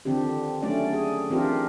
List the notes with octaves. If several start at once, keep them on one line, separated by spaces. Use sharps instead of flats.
D3 D#3 F3 C4 D4 G4
F#3 A3 C#4 D4 D5
G#4
E3 C4 D4 F4 G4 A#4